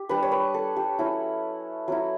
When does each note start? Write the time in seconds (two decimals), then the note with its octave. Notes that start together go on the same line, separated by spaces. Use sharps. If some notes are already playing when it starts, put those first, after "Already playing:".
Already playing: G4
0.09 G3 D4 B4
0.23 C#5
0.32 B4
0.54 A4
0.76 G4
0.99 F#3 C#4 E4
1.88 F#3 C#4 E4